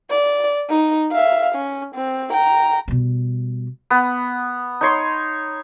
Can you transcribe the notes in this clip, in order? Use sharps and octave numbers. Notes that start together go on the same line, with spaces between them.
D5
D#4
E5 F5
C#4
C4
G5 A#5
B2 G3
B3
D#4 C#5 C6